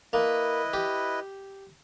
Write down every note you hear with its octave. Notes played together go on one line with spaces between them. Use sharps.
A#3 E4 B4 D#5
G4